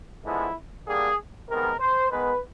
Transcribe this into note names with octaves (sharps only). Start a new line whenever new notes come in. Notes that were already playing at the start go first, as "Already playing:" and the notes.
D3 F3 G#3 B3 E4
D3 G3 A#3 G#4
C3 D#3 G#3 B3 A#4
C5
D#3 G#3 B3 B4